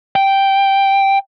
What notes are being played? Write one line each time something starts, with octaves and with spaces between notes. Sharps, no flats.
G5